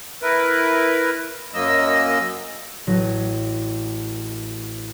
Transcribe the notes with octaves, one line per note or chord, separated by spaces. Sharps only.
E4 A#4 B4
F#2 F#3 A#3 D#5 E6
A1 F#3 A#6 D#7